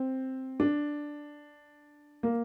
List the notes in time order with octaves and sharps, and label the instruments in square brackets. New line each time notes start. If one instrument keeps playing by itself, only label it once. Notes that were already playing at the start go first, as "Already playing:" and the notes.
Already playing: [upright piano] C4
D4
A#3